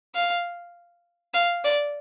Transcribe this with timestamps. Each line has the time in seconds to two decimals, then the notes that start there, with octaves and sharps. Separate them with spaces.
0.15 F5
1.34 F5
1.64 D5